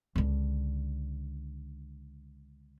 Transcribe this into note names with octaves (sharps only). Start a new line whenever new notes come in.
C#2 D3